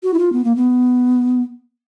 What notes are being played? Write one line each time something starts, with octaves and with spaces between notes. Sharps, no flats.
F#4
E4
F4
B3
A#3
B3